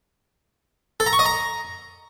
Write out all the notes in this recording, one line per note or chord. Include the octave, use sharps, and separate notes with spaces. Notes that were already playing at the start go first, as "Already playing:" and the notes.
A4
A#5
C#6
D#5
A#5